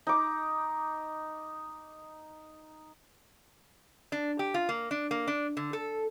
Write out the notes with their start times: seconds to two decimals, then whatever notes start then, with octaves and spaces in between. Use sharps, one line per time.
0.07 D#4 D6
4.12 D4
4.39 G4
4.54 F4
4.69 A#3
4.91 D4
5.11 A#3
5.27 D4
5.57 D3
5.73 A4